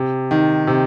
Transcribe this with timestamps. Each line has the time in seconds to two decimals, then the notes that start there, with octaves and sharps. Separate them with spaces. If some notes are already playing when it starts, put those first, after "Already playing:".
Already playing: C3
0.31 D#3
0.67 C3